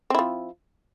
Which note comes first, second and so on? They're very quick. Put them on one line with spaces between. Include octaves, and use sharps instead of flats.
C4 E4 F3